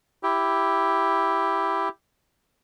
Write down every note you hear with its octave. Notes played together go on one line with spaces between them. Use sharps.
E4 G4